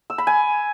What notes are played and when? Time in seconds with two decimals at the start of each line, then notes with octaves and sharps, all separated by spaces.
0.10 E6
0.18 B5
0.27 G#5